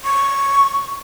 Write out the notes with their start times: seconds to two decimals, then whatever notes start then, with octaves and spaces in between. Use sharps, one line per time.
0.05 C#6